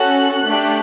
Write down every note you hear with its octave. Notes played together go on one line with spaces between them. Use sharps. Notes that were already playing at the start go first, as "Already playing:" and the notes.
Already playing: C#4 F#4 A4 F#6
A3 D4 G4